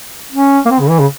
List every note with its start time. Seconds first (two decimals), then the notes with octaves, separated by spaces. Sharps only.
0.32 C#4
0.66 A#3
0.71 C4
0.80 C#3
0.90 E3
1.00 C#3